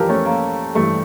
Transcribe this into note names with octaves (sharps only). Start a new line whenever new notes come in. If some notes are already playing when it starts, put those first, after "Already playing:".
Already playing: F2 E3 G3 F4 G4 A4 A#4
A3 C#4
A#3
G2 E3 G3 A3